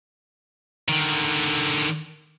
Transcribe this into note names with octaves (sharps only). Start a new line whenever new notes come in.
D3 D#3